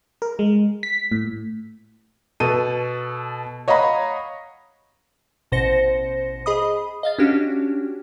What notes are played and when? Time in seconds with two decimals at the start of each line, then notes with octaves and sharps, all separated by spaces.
0.22 A#4
0.39 G#3
0.83 B6
1.12 A2
2.40 B2 A4 D#7
3.68 C#5 D#5 F5 F#5 A#5 B5
5.52 A1 B2 C5 A#6 C#7
6.46 G#4 D#5 B5 D#6
7.03 D#5 F5 A6
7.18 C#4 D4 F#4 G4